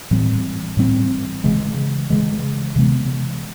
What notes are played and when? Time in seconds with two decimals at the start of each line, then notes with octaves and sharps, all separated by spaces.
0.11 A2 E3 G3 C4
0.77 A2 E3 G3 C4
1.44 C#3 E3 G#3
2.10 C#3 E3 G#3
2.76 C3 E3 G#3 B3